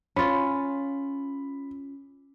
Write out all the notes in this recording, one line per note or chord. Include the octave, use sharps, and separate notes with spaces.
C#4 F4 B5